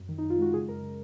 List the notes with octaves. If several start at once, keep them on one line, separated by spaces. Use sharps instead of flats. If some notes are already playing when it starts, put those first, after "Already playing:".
Already playing: F#2
D#3
D#4
F#2
F4
G#3 F#4
C#3 G#4
F#2 A#4
C#3